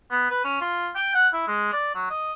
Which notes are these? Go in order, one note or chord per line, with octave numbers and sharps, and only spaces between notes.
B3
B4
C#4
F4
G5
F#5
E4
G#3
D5
F#3
D#5